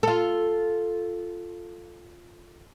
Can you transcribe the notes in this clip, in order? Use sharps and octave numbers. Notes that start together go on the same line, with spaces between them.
F4 A4